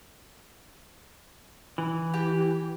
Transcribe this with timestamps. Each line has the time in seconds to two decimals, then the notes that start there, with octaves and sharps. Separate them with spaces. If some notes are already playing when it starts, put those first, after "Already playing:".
1.78 E3
2.14 G4